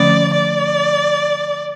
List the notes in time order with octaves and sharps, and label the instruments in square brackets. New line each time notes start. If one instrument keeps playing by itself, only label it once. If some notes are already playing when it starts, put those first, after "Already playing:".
Already playing: [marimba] D3 F3 A3 C#4 [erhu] D5
[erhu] D5